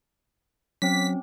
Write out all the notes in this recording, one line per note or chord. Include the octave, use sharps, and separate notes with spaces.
F#3 C4 C#4 B6